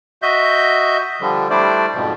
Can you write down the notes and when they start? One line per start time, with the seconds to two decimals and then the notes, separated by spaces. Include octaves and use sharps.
0.22 F#4 D#5 E5 G6
1.21 D3 F3 G3
1.50 G3 A3 D4 E4 C5 D5
1.95 F2 G#2 B2 F3